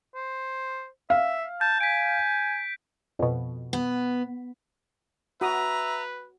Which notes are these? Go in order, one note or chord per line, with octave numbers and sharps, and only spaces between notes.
C5
E5 F5
A5 G6
G#5 B6 D7
F2 B2
B3
F#4 B4 E5 A#5 D#6